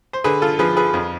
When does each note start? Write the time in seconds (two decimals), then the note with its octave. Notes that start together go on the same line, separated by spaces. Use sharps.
0.13 C5
0.24 D3 G#4 B4
0.42 F4 A4
0.59 F3 G#4 B4
0.77 G#4 B4
0.94 F2